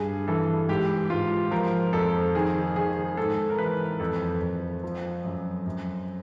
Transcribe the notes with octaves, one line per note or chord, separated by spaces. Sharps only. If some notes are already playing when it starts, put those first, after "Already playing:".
Already playing: G2 G#4
E3 A4
G#2 G4
G#2 F4
F3 A#4
F2 A4
D#3 G#4
D#3 G#4
G#2 A4
A#4
E3 B4
F2 A4
F2
F3
F#2
F#2